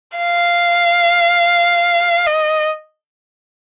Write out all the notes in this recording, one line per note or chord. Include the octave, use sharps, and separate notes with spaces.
F5
D#5